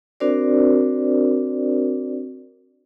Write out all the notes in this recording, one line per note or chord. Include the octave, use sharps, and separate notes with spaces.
C4 D4 F#4 A#4 C5 D5